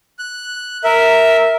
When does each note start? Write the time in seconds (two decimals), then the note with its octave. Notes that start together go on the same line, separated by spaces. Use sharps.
0.19 F#6
0.84 A#4 E5